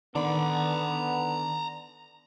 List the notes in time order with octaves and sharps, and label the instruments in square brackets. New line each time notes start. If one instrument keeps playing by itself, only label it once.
[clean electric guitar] D3 [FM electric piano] D#3 D5 [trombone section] B3 [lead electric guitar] A#5 B5